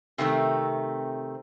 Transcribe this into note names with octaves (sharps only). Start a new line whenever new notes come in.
C3 D#3 A3 C4